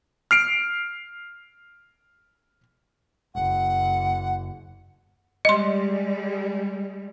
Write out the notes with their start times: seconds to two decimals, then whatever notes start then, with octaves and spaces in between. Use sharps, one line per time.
0.31 F6 C7 D7
3.35 F#1 F#5
5.45 G3 G#3 D#5 C6